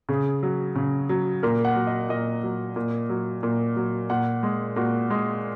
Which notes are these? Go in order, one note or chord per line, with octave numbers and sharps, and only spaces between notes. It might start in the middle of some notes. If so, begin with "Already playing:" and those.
C#3 G#4
F#3
C#3
F#3
A#2 A#4
F#5
F#3
D#5
A#2 D#5
F#3
A#2
F#3
A#2
F#3
A#2 F#5
G#3
A#2 F#4
G#3